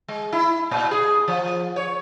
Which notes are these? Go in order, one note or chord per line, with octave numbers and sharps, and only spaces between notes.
G#3
E4
A#2
G#4
F3
C#5